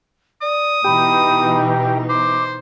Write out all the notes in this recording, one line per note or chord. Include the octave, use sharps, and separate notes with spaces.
D5 D#6
B2 E3 D#4 G4 B5
C5 D6